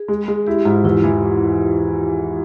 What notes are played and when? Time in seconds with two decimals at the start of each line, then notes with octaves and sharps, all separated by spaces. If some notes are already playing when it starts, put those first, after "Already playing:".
Already playing: G#4
0.08 G#3
0.28 G#3
0.47 E4 G4
0.65 G#2 F4
0.84 E2 E4
1.04 E3